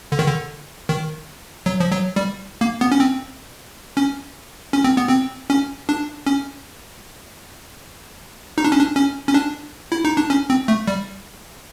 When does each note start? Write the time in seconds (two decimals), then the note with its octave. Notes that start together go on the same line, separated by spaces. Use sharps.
0.12 D3
0.19 D#3
0.27 D3
0.89 D#3
1.66 F#3
1.80 F3
1.92 F#3
2.16 G3
2.61 A#3
2.81 B3
2.92 C#4
3.00 C4
3.97 C#4
4.73 C#4
4.84 C4
4.97 B3
5.09 C4
5.50 C#4
5.89 D4
6.26 C#4
8.58 D#4
8.65 D4
8.72 C#4
8.79 D4
8.96 C#4
9.28 C#4
9.34 D4
9.92 E4
10.05 D#4
10.17 D4
10.30 C#4
10.50 C4
10.68 A3
10.88 G3